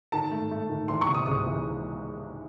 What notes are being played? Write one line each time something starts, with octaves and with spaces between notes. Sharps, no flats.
D#3 A5
A3
A3
D#3
E3 C6
C#6
C3
D#6
C#2 D#6
E3